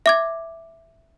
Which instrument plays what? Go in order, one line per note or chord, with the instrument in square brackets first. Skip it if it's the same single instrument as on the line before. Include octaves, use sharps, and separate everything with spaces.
[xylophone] E5 D6 G#6